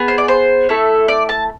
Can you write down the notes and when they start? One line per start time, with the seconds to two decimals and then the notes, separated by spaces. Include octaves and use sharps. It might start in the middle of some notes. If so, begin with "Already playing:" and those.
Already playing: B3 G#4
0.08 C5
0.18 D5
0.28 C5
0.69 A3 E4 A4
1.08 D5
1.29 A5